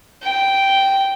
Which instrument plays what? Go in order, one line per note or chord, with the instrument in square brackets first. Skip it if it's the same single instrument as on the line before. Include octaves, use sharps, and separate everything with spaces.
[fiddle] G5